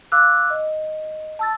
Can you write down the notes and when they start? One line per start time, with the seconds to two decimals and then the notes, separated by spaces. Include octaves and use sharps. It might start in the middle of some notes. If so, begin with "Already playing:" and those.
0.12 F5 D6 E6 F#6
0.50 D#5
1.39 A5 E6 A6